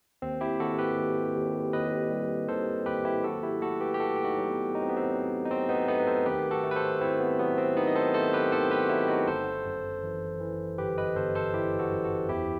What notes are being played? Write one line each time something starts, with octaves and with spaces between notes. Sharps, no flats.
D#2 C4
E4 G4
D#2 F#4 A4
G4 B4
D#2
D#2
D#2 B4 D#5
G3
D#3 A4 C5
D#2 G4 B4
E4 G4
F#3 F#4 A4
E4 G4
A3 F#4 A4
G4 B4
G4
A3 F#4 A4
G4
D#4 F#4
F#3
B3
F#3 D#4
C4
B3
C4
F#3
D#4
F#3 C4
B3 D#4
A3 B3 D#4
B4
A4 C5
D#3 G4 B4
F#4 A4
A3
B4
A4 C5
A3 C4 E4
B3
F#3 B3
C4
D#3 B3 D#4
D#5
A4 C5
A3 A4 C5
G4 B4
D#3 A4 C5
G4 B4
F#4
F#3 E4 G4
D#4 F#4
G1 A4 C5
F#2
E3
E3
G1 G4 B4
B4 D#5
G1 A4 C5
A4 C5
E3 E4 G4
F#4 A4
F#2
F#4 A4
E2 E4 G4